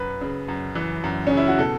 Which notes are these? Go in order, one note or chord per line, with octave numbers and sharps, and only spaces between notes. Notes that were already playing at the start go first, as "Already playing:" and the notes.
Already playing: F#2 B4
C#3
F#2
E3
F#2
C#3 C#4
E4
F#4
B2 A4